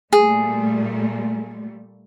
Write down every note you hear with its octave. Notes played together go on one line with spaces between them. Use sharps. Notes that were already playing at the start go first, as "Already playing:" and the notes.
A#2 G3 A3 G#4